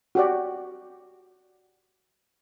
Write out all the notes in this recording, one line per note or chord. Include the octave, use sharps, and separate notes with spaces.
F#4 G4 D5